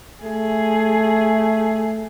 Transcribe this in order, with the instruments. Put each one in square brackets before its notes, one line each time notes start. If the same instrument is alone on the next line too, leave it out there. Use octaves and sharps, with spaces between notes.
[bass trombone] A3 [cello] G#4